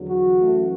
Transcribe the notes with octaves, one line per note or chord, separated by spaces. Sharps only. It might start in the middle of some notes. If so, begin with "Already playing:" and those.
Already playing: E2 D3 F#3
F#4
F#2 E3 A3